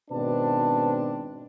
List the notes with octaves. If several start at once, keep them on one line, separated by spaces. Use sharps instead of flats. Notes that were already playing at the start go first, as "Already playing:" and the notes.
G#1 B2 C4 D4 B4 A5